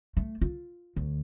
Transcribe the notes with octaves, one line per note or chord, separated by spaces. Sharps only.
A3
F4
D2